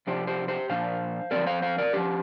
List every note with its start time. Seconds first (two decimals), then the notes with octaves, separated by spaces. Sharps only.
0.07 C3 F3 D4 G4 C5
0.27 G4 C5
0.48 G4 C5
0.69 A#2 F3 D4 C5 F5
1.31 F3 C4 A#4 D5
1.47 C5 F5
1.62 C5 F5
1.78 A#4 D5
1.93 F3 D4 G4